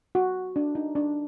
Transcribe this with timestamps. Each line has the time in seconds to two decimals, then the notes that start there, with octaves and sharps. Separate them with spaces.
0.15 F#4
0.56 D4
0.75 D#4
0.95 D4